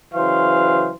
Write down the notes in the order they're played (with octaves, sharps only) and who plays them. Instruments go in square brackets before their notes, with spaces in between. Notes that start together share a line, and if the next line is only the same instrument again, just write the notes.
[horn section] C#3 E3 F#3 C5 F5 C6